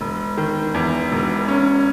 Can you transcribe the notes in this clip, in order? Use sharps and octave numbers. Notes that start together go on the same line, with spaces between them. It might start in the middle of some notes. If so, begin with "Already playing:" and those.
E1
D#3
E2
E1
C#4